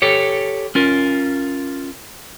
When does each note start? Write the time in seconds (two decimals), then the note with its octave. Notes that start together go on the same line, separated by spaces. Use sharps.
0.02 G4 A4 C#5
0.75 C#4 F4 A#4